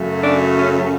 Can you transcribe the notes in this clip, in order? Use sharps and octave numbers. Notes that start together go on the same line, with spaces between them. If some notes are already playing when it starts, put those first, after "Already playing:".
Already playing: F#2 C#3 F#3 A3
D4
C#4